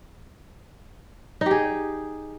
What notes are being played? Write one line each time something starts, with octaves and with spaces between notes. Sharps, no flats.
D#4 G4 G#4